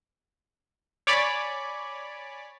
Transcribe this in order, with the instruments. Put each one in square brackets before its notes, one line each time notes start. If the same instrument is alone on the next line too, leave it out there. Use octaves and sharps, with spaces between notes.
[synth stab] C#5 D5 G#5 B5 D6